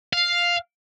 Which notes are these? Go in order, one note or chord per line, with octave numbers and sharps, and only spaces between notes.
F5